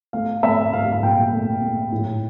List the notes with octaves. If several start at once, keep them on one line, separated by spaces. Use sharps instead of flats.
A3 F5
A3 E5
A3 F5
F5
A#2 G5
A3
A3
A2